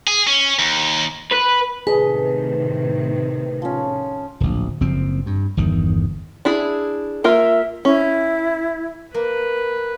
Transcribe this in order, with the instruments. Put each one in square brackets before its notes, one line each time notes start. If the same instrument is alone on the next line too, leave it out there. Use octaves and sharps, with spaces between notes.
[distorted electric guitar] G#4
C#4
D#2
[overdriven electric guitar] B4
[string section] A2 C3 D#3 [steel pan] G#4 [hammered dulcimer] A4 D#5 [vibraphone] B4
[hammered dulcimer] F3 C#4
[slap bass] D1 A#1
F#1 F3 C4
G2
G1 E2 D#3
[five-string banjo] D4 E4 G#4
[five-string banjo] A#3 F4 A#4 [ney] E5
[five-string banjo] C#4 [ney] E4
[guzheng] A#3 [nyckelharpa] B4